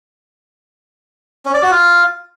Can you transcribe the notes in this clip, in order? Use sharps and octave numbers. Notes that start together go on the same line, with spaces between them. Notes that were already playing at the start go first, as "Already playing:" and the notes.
C#4
D5
F#4
F4